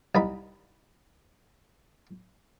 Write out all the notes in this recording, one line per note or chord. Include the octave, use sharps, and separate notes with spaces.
C2 D#4 B5